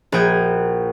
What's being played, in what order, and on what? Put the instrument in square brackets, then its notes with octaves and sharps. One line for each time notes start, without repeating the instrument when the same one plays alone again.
[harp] A#1 F#4 G5 D#6 G#6